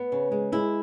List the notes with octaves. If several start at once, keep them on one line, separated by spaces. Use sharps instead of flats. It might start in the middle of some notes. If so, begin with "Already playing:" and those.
Already playing: B3
C#3
G#3
G#3 E4